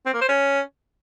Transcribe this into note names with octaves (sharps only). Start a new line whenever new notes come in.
C4
A#3
C5
C#4